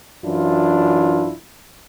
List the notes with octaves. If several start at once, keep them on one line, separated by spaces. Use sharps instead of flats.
F#2 E3 D4 E4 F4